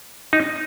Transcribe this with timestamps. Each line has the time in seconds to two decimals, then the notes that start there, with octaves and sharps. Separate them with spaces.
0.33 D#4